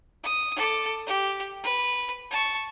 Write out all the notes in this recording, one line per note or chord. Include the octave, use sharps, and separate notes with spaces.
D#6
A4 D6
G4
B4
A5 C#6